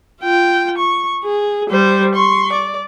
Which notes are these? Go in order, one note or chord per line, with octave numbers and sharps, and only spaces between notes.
F4 G5
C#6
G#4
G3 C5
C6 C#6
D5